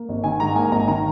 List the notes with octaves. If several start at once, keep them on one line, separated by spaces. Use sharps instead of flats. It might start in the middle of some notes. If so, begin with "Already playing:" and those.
Already playing: A#3
G#1
D#3 G#5
G#2 A#5
A#3 G#5
G#1 A#5
D#3 A#5